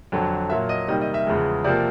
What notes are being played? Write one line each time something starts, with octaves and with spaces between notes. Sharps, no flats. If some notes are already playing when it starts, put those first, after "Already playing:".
F2 D3 F#3
A#2 F#3 A#3 E5
D#5
C3 D#3 G3 A#3 D#5
D#5
E5
E2 C#3 F3 G#3
C3 F3 A#3 D5